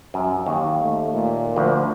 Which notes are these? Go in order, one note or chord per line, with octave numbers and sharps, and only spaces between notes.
F#2
D#2
A3
A#2
D2 F3